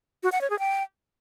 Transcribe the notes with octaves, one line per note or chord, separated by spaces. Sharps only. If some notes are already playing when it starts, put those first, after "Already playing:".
F#4
F#5
C#5
G#4
G5